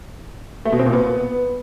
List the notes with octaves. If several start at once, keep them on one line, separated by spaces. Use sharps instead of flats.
A3
B2
C4
A#2
B3